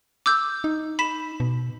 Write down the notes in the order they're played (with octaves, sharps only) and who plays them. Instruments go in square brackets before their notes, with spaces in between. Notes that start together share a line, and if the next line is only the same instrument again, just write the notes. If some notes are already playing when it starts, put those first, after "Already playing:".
[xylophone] D6 E6 G6
[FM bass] D#4
[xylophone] B5 B6 E7
[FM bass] B2